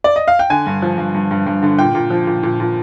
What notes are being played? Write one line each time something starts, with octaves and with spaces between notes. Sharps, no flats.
D5
D#5
F5
G5
D3 G#5
G2
F3
G2
G2
G2
G2
D3
A#2 G5
A#2
F3
A#2
A#2
A#2